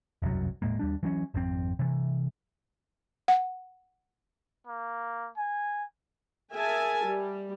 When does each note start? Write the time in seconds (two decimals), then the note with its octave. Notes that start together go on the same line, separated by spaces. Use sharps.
0.22 E1 C2 F#2 F#3
0.62 D#1 A2 G#3 A#3
0.79 D#2 G3 D4
1.03 E3 F#3 C4 C#4
1.34 G#1 F2 C#3 C4
1.79 C3 E3
3.28 F#5
4.67 A#3
5.37 G#5
6.52 G#4 A#4 E5 G#5 A5
7.05 G3